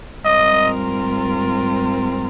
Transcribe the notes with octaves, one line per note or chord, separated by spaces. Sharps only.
G#2 G3 C4 F4 A#4 D#5